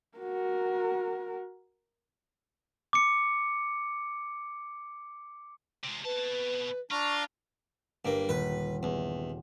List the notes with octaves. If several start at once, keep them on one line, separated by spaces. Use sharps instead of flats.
F#4 A#4
D6 C#7
C3 G#3
B2 B4 A5
D4 F4 A#5 C#6 F6
G1 G2 A#3
D#1 B4
E2